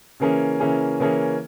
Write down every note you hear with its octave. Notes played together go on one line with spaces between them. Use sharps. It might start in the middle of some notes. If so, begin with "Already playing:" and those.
C#3 E3 A#3 C#4 G#4
C#3 E3 A#3 C#4 G#4
C#3 E3 A#3 C#4 G#4